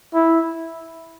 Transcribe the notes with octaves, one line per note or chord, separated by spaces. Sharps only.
E4